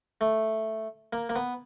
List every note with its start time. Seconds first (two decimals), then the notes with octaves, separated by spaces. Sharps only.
0.21 A3
1.13 A#3
1.29 A#3
1.36 B3